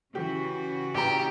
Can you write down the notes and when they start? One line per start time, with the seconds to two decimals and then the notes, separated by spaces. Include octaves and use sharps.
0.15 C#3 E3 F#4 G4
0.94 A#1 B3 G4 A#5